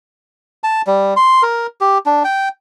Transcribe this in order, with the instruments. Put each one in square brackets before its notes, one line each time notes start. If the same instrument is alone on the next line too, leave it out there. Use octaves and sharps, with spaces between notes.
[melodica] A5
G3
C6
A#4
G4
D4
G5